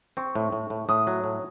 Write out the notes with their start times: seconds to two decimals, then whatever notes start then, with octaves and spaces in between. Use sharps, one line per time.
0.17 C4 C#6
0.35 A2
0.52 A2
0.70 A2
0.89 A2 D#6
1.07 F#3
1.24 A2